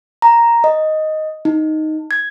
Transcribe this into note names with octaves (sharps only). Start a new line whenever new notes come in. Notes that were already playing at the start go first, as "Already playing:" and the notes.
A#5
D#5
D#4
G#6